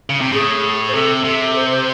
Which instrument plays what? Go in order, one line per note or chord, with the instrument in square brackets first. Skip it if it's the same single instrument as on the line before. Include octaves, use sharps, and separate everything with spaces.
[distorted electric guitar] C#3
C3
[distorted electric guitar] A2 [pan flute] G#4
[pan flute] C5
[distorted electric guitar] C3 [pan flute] A4
[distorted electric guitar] C3
[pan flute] A4
C5
C5